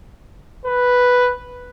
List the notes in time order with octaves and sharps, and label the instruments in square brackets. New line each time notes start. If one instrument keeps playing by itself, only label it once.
[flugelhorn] B4